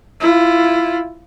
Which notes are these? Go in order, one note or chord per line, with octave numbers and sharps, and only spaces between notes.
E4 F4